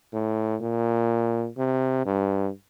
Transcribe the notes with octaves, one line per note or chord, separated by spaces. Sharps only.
A2
A#2
C3
G2